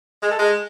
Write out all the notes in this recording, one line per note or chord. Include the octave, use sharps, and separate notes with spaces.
G#3
A4
G#3